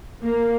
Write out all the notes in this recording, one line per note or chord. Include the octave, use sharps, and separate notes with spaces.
A#3